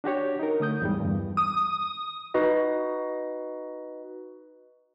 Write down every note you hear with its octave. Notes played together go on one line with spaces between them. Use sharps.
D4 F#4 G4 C#5
D#4 A#4
D3 A3 D#6 G6
E2 G#2 G3
E2 G2
D#6
D#4 F#4 B4 D#5